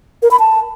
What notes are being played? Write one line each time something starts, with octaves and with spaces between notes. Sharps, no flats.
A#4
B5
A5